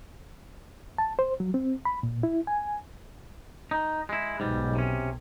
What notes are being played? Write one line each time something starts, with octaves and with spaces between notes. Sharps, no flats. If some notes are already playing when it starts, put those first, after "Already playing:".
A5
C5
F#3
C4
B5
A#2
E4
G#5
D#4
G#3 E4
B1 G#2 G3
C3 C#4